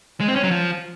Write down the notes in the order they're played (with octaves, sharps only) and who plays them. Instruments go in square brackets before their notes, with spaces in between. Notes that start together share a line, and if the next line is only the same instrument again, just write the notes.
[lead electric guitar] G#3
C4
C#4
F#3
F3